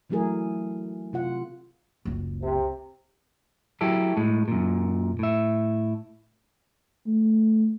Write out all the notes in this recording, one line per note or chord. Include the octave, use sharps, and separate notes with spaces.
E3 F#3 A3 E4 G#4 A#4
C3 F4 F#5
F#1 C#2
C3
F#3 E4 G4 A4
A2 G#3
F#2 A#2
A2 E5
A3